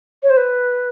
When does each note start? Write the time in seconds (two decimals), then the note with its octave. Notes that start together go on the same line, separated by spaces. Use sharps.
0.23 C#5
0.30 C5
0.37 B4